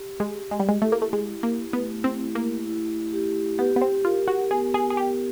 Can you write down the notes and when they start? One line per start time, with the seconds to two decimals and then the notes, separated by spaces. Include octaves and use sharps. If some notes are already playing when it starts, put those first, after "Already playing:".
Already playing: G4
0.20 G#3
0.36 G4
0.51 G#3
0.60 G3
0.69 G#3
0.82 A3 E4
0.92 A#3
1.02 A3
1.13 G#3
1.28 E4
1.43 A#3
1.73 A3 B3
2.04 C4
2.21 E4
2.35 A#3
2.67 E4
3.13 G4
3.58 B3 G4
3.76 B3
3.81 C4
4.05 F4 A#4
4.28 F#4
4.51 B3 G#4
4.74 G#4
4.90 G#4
4.97 B3 G4